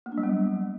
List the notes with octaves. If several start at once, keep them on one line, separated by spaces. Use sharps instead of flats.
A#3
D4
G3
B3
F#3